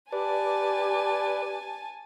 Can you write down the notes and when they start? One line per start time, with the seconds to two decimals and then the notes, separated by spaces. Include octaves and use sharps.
0.12 G4 B4 D5 G#5 A5